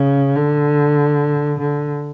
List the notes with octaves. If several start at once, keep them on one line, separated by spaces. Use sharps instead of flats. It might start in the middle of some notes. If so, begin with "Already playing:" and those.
Already playing: C#3
D3
D3